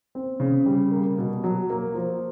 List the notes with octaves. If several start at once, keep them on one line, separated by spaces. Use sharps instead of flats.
C4
C#3
G3
A#3
B2
F#3
A#3
F3